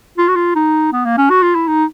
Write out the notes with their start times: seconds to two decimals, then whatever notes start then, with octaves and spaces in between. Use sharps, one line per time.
0.17 F4
0.28 F#4
0.36 F4
0.55 D#4
0.92 B3
1.05 A#3
1.17 C#4
1.30 F#4
1.42 F4
1.55 E4
1.68 D#4